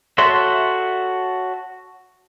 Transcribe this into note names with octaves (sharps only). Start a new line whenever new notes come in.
F#4 A4 C#5 E5 C6